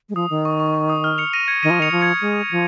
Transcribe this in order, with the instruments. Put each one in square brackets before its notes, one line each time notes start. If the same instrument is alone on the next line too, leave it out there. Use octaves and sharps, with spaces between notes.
[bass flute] G#3
[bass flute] F3 [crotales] D#6
[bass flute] D#3
[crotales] C#6
C#6
C#6
D#6
F6
C#7 F7
A#6 D#7
G#6 C#7
[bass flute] D#3 [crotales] A#6 D#7
[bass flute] F3
[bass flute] D#3 [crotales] C#7 F7
[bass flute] F3
[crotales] G#6 C#7
[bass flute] G#3
F3